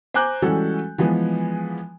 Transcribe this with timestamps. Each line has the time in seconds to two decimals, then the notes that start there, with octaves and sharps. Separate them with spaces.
0.14 C5 G#5 A#5 D6 F#6 G6
0.42 E3 G3 G#3 C#4 F#4 A4
0.98 E3 F3 G#3 B3